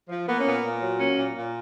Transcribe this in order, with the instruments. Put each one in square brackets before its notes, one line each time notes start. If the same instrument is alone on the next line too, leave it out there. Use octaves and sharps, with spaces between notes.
[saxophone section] F3
A#3 B3
C#4
A#2 B3
A#2
F#3
A#3 C#4
A#2
A#2